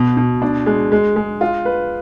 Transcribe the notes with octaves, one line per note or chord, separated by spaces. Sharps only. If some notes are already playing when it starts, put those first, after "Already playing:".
Already playing: B2
B2
D4
G#3
G#3
G#3
F4
B4